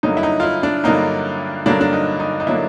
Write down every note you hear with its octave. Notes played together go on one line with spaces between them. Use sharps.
G2 D3 F#3 A#3 D#4
E4
D#4
F4
E4
D4
G2 D3 F#3 A#3 D#4
G2 D3 F#3 A#3 D4
D4
D#4
D#4
D#4
D3 F#3 A#3 E4